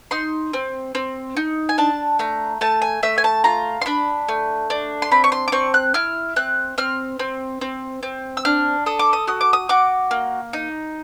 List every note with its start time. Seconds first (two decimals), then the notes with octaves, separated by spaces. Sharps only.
0.11 D#4 C6
0.53 C4
0.95 C4
1.37 D#4
1.69 G#5
1.78 D4 A5
2.19 A3 A#5
2.61 A3 A5
2.82 G#5
3.03 A3 E5
3.18 G#5
3.24 A5
3.44 F4 A#5
3.81 C6
3.86 D4 B5
4.29 A3
4.70 D4
5.02 C6
5.11 C4 B5
5.24 C#6
5.32 C6
5.48 D6
5.52 C4 C#6
5.74 F#6
5.94 E4 F6
6.36 C4 F#6
6.78 C4 F6
7.19 C4
7.61 C4
8.03 C4
8.37 E6
8.45 D4 F6
8.86 A4 D#6
8.99 D6
9.13 D#6
9.27 F#4 D#6
9.41 D6
9.53 D#6
9.69 F#4 D6
10.11 A#3
10.53 D#4